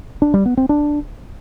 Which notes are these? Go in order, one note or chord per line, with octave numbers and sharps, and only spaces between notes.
D4
G3
B3
C4
D4